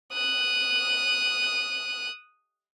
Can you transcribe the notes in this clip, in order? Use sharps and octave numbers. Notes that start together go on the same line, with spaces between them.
D#6 F#6